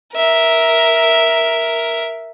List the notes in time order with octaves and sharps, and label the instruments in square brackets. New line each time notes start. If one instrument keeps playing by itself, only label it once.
[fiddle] A#4 E5